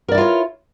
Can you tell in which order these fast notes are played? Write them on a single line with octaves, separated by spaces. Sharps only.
A#4 D5 E4 F4 C#5